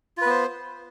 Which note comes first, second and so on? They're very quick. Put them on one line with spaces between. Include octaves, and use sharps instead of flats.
F4 B4 B3 C5